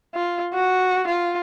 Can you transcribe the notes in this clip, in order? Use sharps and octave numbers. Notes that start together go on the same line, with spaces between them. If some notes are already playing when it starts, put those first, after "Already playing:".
F4
F#4
F4